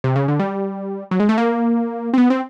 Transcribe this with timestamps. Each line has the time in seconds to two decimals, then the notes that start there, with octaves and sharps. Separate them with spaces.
0.04 C3
0.16 C#3
0.28 D3
0.40 G3
1.11 F#3
1.20 G#3
1.29 A3
1.38 A#3
2.14 C4
2.18 B3
2.30 C4